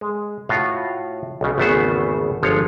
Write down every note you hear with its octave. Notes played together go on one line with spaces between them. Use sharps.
G#3
A2 F4 F#4 F5
B1 C#3
G#1 E2 C#3 A3 B3 C5
G1 F3 G#3 C#5 F5